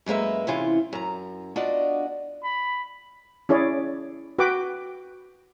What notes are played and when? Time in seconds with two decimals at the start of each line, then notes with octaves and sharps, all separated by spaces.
0.06 F#2 G#3 A#3 B4 E5
0.47 C3 E3 C#4 F4
0.93 F#2 A#5
1.56 B3 D4 F4 F#4 D5 D#5
2.44 B5
3.49 C#4 E4 G#4 C#5 D5
4.39 F#4 B4 F#5 G5 D6